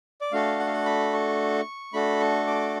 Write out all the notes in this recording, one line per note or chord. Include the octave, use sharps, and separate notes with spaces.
D5
A3 D4 F#4 A4 F5
F#5
F5
F#5
B5
C#6
A3 D4 F#4 A4 B5
C#6
D6